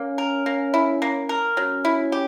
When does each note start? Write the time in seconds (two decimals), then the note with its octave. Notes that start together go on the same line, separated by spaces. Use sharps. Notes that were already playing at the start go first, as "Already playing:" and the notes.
Already playing: A#3 C#4
0.18 A#4
0.46 A#3
0.74 E4
1.02 A#3
1.29 A#4
1.57 F#3 C#4
1.85 E4
2.12 G4